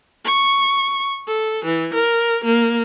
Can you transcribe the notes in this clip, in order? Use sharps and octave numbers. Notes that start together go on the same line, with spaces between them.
C#6
A4
E3
A#4
A#3